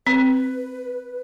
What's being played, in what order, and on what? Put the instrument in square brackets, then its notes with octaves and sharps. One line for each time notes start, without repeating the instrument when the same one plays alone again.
[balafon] C4 [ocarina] B4